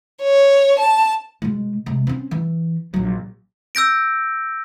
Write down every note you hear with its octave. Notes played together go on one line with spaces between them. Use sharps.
C#5
A5
B2 G#3
C3 G#3
C4 C#4
E3
A#1 F#3
E6 G6 A#6 D7